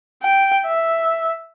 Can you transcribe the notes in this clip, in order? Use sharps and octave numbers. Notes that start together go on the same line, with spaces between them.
G5
E5